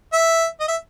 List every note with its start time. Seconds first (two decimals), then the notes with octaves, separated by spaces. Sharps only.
0.13 E5
0.60 D#5
0.68 E5